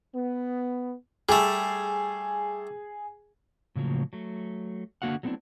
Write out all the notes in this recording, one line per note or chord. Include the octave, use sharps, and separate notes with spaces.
B3
G3 A3 G#4
A2 C#3 F3 F#3 A#3
F#3 A3
D3 A#3 F#4 F5 F#5
F#3 A3 B3 C4 D4 E4